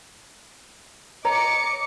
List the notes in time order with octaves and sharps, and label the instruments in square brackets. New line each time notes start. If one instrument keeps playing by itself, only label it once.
[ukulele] C#5 A#5 [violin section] D#5 D6 C#7